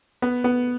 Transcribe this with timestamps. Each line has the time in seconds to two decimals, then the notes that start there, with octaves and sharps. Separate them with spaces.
0.22 B3
0.44 B3